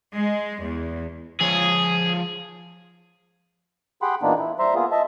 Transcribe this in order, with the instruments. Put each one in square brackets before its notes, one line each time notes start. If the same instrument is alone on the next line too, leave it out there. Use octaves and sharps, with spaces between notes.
[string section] G#3
E2
[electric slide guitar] F3 C#5 [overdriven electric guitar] G#4
[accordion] G4 G#4 F#5 G5 B5 C6
A#2 E3 A#3 B3 D4 D#4
E4
G3 C5 E5 A#5 C6
A#3 B3 F4 G#4
D#5 E5 A5